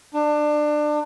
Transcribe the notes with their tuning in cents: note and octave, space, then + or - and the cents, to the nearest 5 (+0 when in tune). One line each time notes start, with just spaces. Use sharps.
D4 +25